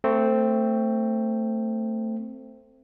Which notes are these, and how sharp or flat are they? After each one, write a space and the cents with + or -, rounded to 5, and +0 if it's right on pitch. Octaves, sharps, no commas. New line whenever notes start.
A3 +25 C4 +0